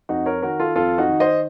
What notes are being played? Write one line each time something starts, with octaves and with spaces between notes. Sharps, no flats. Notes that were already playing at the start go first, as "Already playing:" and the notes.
F2 D#4 F#4
A#4 C#5
D#3 F#4 A#4
F4 A4
F2 F4 A4
D#4 F#4
D#3
C5 D#5